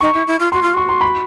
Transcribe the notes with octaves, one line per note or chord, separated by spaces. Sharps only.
D#4 C#6
E4
E4
F4
F#4 C6
F4
F#4 C#6
C6
B5